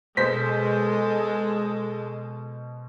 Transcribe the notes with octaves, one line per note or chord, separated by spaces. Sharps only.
B2 G#3 A4 C5 B6